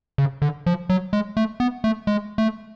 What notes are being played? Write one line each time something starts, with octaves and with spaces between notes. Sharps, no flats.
C#3
D3
F3
F#3
G#3
A3
B3
A3
G#3
A3